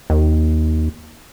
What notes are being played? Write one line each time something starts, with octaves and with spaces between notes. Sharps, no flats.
D#2